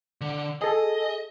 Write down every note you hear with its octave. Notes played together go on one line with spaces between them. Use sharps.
D3
G#4 A4 D#5